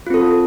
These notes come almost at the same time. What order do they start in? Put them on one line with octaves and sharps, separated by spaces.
F4 C4 A4